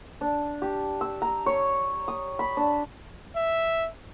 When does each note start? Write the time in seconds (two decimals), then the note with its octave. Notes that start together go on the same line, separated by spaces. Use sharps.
0.21 D4
0.62 G4
1.01 E6
1.22 A#5
1.46 C#5
2.08 D#6
2.39 B5
2.57 D4
3.36 E5